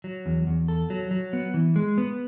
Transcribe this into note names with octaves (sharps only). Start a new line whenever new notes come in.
F#3
E2
E2
A4
F#3
F#3
B3
E3
G#3
B3